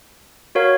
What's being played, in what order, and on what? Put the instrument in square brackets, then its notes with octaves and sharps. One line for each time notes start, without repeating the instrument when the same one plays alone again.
[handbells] F#4 A#4 C#5 F5